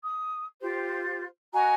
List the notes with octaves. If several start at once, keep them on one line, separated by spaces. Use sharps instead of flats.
D#6
F4 G4 C5
F#4 D#5 G#5 A#5